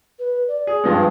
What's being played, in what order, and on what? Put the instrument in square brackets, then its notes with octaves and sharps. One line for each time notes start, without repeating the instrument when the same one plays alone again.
[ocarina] B4
D5
[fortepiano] G#4
[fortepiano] G2 F3 G#3 [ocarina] B4